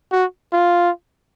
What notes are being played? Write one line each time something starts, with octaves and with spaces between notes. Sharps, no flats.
F#4
F4